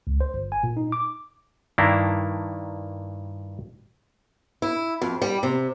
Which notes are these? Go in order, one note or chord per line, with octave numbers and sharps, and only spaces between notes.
C#2
C5
G1
G#5
A#2
D#4
D6
G2 D#3 A#3 D4 E4
E4
F2
G3
C3